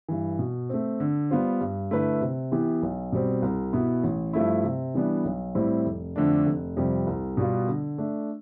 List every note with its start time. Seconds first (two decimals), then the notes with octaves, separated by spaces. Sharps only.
0.09 G2 E3
0.39 B2
0.70 A3 C4
1.00 D3
1.30 G3 B3 F4 C5
1.61 G2
1.91 D3 A3 E4 B4
2.21 C3
2.52 E3 B3 E4 G4
2.82 B1
3.12 B2 G3 C4
3.42 C2
3.73 B2 B3 E4
4.03 A1
4.33 G2 F3 A3 E4
4.64 C3
4.94 E3 G3 B3 D4
5.25 B1
5.55 A2 G3 C4 E4
5.86 F1
6.16 F2 D3 A3 D4
6.46 F1
6.77 F2 C3 G3
7.07 C2
7.37 B2 G3 B3 F4
7.68 D3
7.98 A3 D4